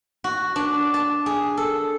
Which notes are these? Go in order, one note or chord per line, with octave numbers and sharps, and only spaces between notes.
F#4
D4
A5
G#4
A4